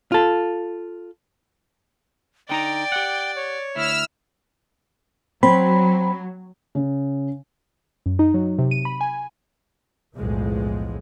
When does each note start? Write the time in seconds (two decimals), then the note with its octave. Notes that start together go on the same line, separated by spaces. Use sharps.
0.12 F4 A4
2.49 D3 D#4 D5 G5 A#5
2.92 G4 F#5
3.36 C#5
3.76 D2 E4 E6 F6
5.43 F#3 C4 B5
6.75 C#3
8.06 F#2
8.19 D#4
8.34 F#3
8.59 C3
8.71 D#7
8.85 B5
9.01 G#5
10.16 B1 E2 A2 E3 F3 G#3